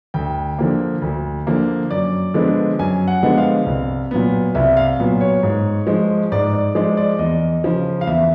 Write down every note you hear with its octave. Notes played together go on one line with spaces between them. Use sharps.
D2 G5
D3 F3 A#3
D2
D3 F3 A#3
F#2 D5
D3 F3 G#3 B3
F#2 G#5
F#5
D3 F3 G#3 B3
F5
C2
A#2 F#3 B3
C2 E5
F5
A#2 F#3 B3
C#5
G#2
F3 G#3
G#2 D5
D5
F3 G#3 D5
D5
E2 D#5
C#3 F3
F5
E2 E5